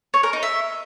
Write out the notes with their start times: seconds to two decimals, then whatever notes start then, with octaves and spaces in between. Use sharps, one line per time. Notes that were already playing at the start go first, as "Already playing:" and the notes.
0.14 C#5
0.23 A#4
0.33 D#4
0.43 E5